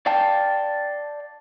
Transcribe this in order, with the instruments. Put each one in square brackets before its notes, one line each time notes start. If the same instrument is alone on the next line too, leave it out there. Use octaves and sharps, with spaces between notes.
[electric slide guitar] D5 F5 G5 A5